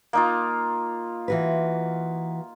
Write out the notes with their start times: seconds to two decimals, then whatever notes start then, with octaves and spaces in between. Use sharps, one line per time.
0.13 A#3 D#4 F4
1.28 E3 F#4 B4